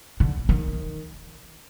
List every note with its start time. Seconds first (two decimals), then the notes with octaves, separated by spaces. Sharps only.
0.20 D3
0.49 D#3